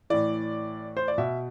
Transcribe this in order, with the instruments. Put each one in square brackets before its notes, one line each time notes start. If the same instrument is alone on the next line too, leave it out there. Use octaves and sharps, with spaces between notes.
[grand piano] A2 E3 D5
C5
D5
B2 E5